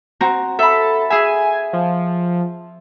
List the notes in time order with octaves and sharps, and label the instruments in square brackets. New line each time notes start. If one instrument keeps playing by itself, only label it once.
[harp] C4 F#4 A#5
[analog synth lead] A4 [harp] E5 B5
[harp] G#4 E5 [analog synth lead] G#5
[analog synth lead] F3